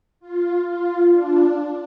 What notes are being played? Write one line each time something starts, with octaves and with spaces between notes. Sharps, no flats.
F4
F4
D4